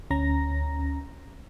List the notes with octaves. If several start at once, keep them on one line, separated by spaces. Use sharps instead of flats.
D2 C#4 A#5 A#6